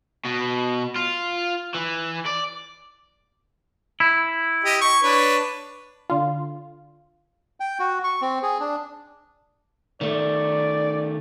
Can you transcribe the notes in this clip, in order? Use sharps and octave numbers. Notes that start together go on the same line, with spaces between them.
B2
F4
E3
D5
E4
G4 D#5
C#6
D4 B4 C#5
D3 F4
G5
F#4
C#6
C4
G#4
D4
D#3 A3 D5